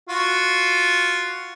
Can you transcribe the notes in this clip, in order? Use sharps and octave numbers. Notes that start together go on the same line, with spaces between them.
F4 F#4